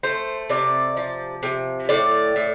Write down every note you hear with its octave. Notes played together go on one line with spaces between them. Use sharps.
A3 C5
C3 D5
F3
C3
A2 D5
A2